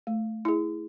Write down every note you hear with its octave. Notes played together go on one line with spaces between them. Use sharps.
A3
E4 G#4